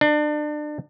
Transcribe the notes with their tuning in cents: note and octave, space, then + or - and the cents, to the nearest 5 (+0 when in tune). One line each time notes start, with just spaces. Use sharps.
D4 +30